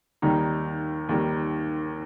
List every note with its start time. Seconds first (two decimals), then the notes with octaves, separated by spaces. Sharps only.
0.22 D#2 D#3 G3 D#4
1.09 D#2 D#3 G3